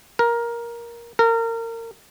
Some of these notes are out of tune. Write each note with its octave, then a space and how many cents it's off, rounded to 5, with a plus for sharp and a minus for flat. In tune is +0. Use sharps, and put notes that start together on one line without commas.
A#4 +10
A#4 -30